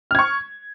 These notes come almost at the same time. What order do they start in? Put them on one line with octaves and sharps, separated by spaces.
F6 G#6 C#6